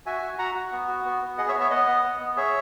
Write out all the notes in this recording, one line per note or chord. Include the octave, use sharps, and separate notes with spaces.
F#4 E5 G#5
F#4
F#4 F#5 A#5
F#4
B3
F#4
B3
B3
G#4 D#5 F#5
C#5 E5
B3
C#5 E5
B3 D#5 F#5
B3
B3
B3
G#4 C#5 E5